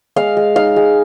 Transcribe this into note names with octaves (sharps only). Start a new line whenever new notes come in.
G#3 F5
G#3
D#4 F5
G#3